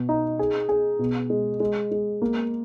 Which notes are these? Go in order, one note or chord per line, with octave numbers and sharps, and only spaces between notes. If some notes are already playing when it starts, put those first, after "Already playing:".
Already playing: B2
D#4
G#4
G#4
B2
G#3
G#3
G#3
A#3